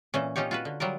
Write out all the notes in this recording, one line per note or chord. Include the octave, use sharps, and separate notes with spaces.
A#2 E3 C#4
C#4 D#4 F4 G4 C#5
F4 F#4 B4
D3
F#3 G3 F4 A#4